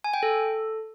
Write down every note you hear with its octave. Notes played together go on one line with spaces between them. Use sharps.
G#5
G5
A4